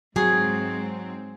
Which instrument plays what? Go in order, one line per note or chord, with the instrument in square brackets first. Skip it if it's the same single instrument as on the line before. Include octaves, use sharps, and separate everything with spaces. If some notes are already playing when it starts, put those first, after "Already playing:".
[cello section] G#2 C4 [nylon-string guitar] F#3 [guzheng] G#4